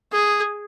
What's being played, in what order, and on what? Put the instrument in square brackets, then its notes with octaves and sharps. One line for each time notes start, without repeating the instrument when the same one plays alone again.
[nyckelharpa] G#4